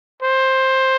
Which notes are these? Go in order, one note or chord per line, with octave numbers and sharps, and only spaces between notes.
C5